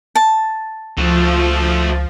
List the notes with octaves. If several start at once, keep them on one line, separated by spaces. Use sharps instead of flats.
A5
C#2 F3 A3 F#4